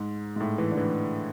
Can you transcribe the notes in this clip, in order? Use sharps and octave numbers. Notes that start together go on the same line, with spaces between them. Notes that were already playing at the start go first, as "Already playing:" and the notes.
Already playing: G#2
G#2
A2
E3
D3
E3